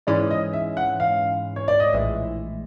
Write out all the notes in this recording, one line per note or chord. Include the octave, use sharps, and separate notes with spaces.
G#2 E3 G#3 C#4 D5
D#5
E5
F#5
F5
C#5
D5
D#5
A#1 A2 E3 G#3 E5